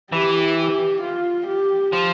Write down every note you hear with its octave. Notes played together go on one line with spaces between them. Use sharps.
E3 G4
G4
F4
G4
F3